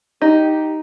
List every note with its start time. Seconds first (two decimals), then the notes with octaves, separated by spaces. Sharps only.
0.22 D#4 G4